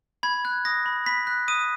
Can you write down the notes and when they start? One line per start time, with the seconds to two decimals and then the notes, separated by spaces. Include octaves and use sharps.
0.23 B5 G#6
0.45 F#6 G#6
0.65 D#6 A#6
0.86 B5
1.06 B5 B6
1.27 F#6
1.48 D#6 D#7